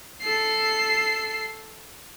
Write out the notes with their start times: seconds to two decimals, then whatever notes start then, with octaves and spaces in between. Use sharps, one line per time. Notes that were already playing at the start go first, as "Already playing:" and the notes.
0.21 A4 C7